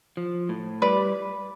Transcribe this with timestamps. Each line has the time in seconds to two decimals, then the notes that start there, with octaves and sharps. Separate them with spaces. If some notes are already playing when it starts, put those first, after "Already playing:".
0.17 F3
0.49 A2
0.82 G3 B4 D5